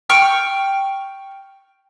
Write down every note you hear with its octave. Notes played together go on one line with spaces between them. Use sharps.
G5 C#6 F6